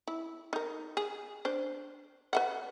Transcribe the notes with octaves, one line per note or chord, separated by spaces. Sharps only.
E4
D#4 A#4
G#4
D4 C5
B4 E5 F#5